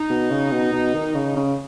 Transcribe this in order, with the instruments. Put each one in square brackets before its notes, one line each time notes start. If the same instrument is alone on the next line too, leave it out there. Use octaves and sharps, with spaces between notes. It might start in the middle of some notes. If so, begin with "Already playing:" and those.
Already playing: [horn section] D#4
[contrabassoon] B2
C#3
B2
B2
D#3
C#3
C#3